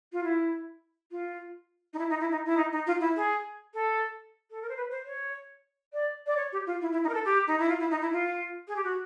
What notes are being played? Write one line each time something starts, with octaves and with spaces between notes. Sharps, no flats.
F4
E4
F4
D#4
E4
D#4
E4
D#4
E4
D#4
D#4
F4
E4
G#4
A4
A4
A#4
C5
B4
C5
C#5
D5
D5
C#5
G4
F4
E4
E4
D#4
A#4
A4
G4
D#4
E4
F4
E4
D#4
E4
F4
G#4
G4
F#4